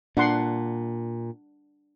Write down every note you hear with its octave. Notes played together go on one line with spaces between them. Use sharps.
A#2 D4 F#5 C6